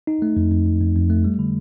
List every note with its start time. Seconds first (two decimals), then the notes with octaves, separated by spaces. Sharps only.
0.07 D#4
0.22 A3
0.36 F2
0.52 F2
0.66 F2
0.81 F2
0.95 F2
1.10 A3
1.24 G3
1.39 D3